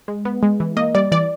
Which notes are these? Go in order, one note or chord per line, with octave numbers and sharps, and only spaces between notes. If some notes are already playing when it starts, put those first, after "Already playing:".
G#3
B3
G#3
E3
A#3 D#5
G3 D5
E3 D5